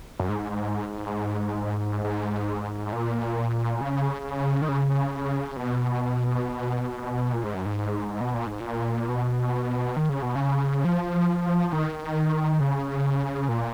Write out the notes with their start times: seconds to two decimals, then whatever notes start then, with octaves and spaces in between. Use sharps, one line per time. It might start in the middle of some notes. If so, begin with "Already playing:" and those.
0.20 F#2
0.29 G#2
2.04 G#2
2.92 A#2
3.81 C#3
4.62 D#3
4.68 C#3
5.56 B2
7.33 A#2
7.43 G#2
7.54 F#2
7.66 G#2
8.21 B2
8.34 A#2
8.47 G#2
8.60 A#2
9.08 B2
9.96 D#3
10.09 C#3
10.22 B2
10.35 C#3
10.85 F3
11.72 D#3
12.60 C#3
13.48 A#2